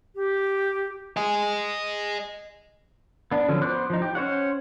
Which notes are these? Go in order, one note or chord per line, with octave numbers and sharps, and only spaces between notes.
G4
D#5 G#5
B3 D4
D3 F3 F#3 C#4
B3 C5 D6 F#6
F3 D#4
G4
C#4 C5 C#5 F#5